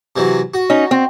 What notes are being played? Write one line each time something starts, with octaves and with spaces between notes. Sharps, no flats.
C3 E3 F#3
F#4
C#4 D#4
C4